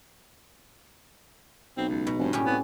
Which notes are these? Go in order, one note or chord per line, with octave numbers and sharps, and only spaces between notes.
B1 C4
C#2
B2
F1 G2
F#1 A2 C#4 G4
C2 B3